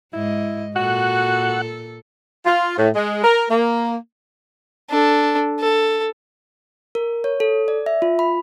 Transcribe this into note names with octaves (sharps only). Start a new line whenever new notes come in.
G#2 E4 D#5
A#2 F#4 A4 F#5
F4
A2
G#3
A#4
A#3
D4 A4
A4
A#4
C#5
A4
D5
E5
F4
B5